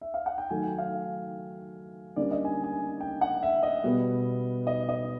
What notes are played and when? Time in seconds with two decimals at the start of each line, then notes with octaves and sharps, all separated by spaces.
0.01 E5
0.14 F5
0.26 F#5
0.38 G5
0.50 D#3 F#3 A3 G#5
0.65 G5
0.78 F5
2.16 D3 G3 A#3 C#4 D5
2.31 D#5
2.45 G#5
2.64 G#5
3.00 G5
3.21 F#5
3.43 E5
3.63 D#5
3.84 B2 G3 B3
4.67 D#5
4.89 D#5